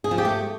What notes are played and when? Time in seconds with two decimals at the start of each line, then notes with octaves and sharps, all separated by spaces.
0.04 G#4
0.11 F3
0.18 G4
0.25 A3